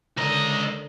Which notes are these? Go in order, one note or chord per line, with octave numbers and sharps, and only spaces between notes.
C#2 D3 A#4 D#5 A#5 A#6